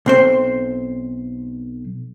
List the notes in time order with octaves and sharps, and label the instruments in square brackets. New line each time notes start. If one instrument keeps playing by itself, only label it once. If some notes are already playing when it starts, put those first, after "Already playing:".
[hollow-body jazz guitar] B1 C4 C5